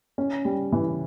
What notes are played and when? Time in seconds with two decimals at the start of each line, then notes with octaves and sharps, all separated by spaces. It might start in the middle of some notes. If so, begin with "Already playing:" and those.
0.18 C#4
0.45 G3
0.72 E3